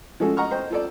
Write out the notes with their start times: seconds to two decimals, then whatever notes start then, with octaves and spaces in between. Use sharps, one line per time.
0.20 F3 G#3 A3 C#4 F#4 A4
0.37 D#5 F#5 A#5 C#6 F6
0.51 C5 D#5 G5
0.70 F4 A4 D5